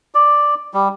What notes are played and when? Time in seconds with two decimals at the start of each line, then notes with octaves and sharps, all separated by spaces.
0.14 D5
0.74 G3